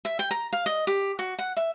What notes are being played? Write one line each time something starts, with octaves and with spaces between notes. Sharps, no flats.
E5
G5
A#5
F5
D#5
G4
F#4
F#5
E5